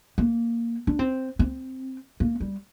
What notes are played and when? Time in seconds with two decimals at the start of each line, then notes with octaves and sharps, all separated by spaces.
0.18 A#3
0.87 D4
0.99 C4
1.39 C4
2.20 A#3
2.40 G3